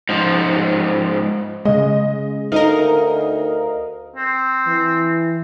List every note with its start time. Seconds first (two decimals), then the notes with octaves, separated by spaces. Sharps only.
0.09 G#2 F3
1.65 C#3 G#3 D#5
2.52 D2 D#4 A#4 D#5 F5
4.16 C4
4.67 E3